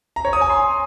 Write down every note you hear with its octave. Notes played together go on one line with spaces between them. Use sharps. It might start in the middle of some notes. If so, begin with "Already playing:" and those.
A#5
C#5
D#6
G#5
C6